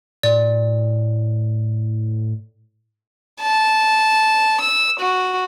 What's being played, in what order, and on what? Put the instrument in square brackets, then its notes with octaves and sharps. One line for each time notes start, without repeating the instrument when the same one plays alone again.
[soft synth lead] A2 [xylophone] D5
[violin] A5
E6
F#4